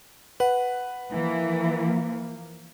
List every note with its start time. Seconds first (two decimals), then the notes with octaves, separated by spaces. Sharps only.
0.40 B4 F#5
1.12 E3 F3 A#3